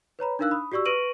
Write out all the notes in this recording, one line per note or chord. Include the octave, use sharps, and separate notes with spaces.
B4 C#5 A#5 B5
D4 D#4 A#4 F5 E6 F#6
B5 D#6
F#4 G4 D5 C#6 E6
B4 C#6 A#6 D7 D#7 F#7